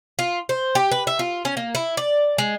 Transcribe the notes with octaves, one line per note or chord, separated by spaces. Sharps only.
F4
C5
G4
B4
E5
F4
C#4
A#3
E4
D5
G#3